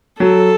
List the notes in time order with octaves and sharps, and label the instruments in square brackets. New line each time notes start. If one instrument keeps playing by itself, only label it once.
[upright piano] F#3 [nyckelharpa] A4